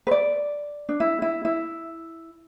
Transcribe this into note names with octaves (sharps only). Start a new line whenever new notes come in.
B4
D5
D4
E4
E4
E4